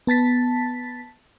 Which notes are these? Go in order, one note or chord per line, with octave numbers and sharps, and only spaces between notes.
B3 A5 A6 B6